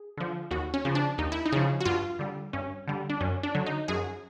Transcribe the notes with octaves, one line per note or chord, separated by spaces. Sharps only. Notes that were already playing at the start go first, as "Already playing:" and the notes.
Already playing: G#4
D3 F3
D#2 F#4
C#4
C#3 F3
D4
D#2 D#4
E4
D#4
C#3 F3
F#4
G2 F4
D3 G3
G2 C#4
D3 G3
D4
F#2 C#4
D4
D3 F#3
D#4
F#2 G#4